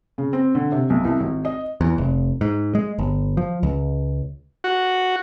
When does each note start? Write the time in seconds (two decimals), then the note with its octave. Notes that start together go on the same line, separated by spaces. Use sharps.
0.18 C#3
0.33 C4
0.55 D3
0.72 C3
0.90 B1
1.05 C2
1.20 G#1
1.45 D#5
1.81 E2
1.98 F1
2.41 G#2
2.75 G#3
2.99 G1
3.37 F3
3.63 C#2
4.64 F#4